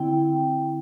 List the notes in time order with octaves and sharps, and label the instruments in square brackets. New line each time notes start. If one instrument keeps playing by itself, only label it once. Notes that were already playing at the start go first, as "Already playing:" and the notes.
Already playing: [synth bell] D3 C4 E4 G5